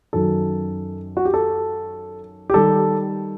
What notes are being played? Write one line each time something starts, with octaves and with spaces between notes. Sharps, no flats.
F#2 D#3 F#3 A4
F#4
G4
A4
G4
D#3 G3 A4